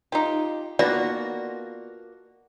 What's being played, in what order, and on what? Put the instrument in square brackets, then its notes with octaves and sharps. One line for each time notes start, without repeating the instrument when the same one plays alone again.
[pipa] D#4 G4 [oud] F4
[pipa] D#3 B3 [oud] A#3 D4 F4 [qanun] F#4 [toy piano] D5